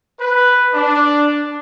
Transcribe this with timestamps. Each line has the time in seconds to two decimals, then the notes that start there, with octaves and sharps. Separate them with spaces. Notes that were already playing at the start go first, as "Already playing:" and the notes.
0.18 B4
0.74 D4